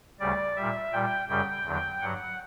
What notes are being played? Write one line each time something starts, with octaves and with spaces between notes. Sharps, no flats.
D2 C#3 G3 D5
A#2 G3 E5
A#2 G3 G5
F#2 C#3 G3 G5
E2 D3 F#3
G2 F#3 F#5